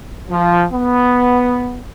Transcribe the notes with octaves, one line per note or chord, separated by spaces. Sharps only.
F3
B3